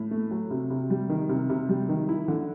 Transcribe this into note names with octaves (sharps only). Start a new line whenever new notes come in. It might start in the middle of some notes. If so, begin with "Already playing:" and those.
Already playing: A2
A3
F#3
C3
C3
G3
D#3
C3
C3
G3
D#3
E4
D3